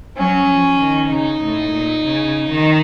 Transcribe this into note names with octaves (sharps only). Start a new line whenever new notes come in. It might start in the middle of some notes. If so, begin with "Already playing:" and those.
F#3 C#4
F3
D#3
C#3 D#4
A2
A#2
C#3
D#3